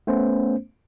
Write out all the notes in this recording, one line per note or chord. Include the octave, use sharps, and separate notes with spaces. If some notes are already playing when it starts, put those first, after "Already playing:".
A3 B3 C#4 C5